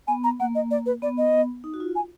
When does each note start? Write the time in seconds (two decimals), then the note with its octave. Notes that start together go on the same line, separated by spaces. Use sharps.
0.07 B3 G#5
0.24 A#5
0.40 A#3 F#5
0.55 D#5
0.71 D5
0.86 B4
1.02 B3 D5
1.18 D#5
1.64 D#4
1.74 F#4
1.80 F4
1.95 G#5